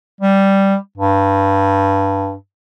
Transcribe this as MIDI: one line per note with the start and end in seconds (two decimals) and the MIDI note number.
0.21 0.75 55
0.97 2.34 43